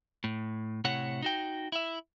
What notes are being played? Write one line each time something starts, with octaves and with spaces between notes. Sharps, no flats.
A2
A2 C3 E4 C#5 F#5
D#4 F#4 G5
E4 E5